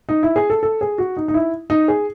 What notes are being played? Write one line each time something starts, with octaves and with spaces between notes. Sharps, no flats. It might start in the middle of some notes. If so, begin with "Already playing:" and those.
D#4
E4
G#4
A4
A4
G#4
F#4
D#4
D#4
E4
D#4
G#4